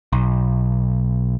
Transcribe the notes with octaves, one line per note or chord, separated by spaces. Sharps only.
B1